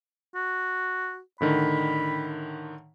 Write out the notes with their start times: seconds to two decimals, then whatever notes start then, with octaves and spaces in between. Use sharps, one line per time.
0.35 F#4
1.41 A2 D3 D#3 B5